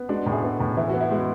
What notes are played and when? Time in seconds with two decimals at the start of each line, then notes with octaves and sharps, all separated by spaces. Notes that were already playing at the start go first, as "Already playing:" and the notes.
Already playing: B3
0.09 G#3 D4 F#4
0.26 A2
0.32 E4 G#4
0.44 B3
0.60 A2
0.77 E3 E4
0.89 B3 F#4
1.01 E4
1.11 G#3 F#4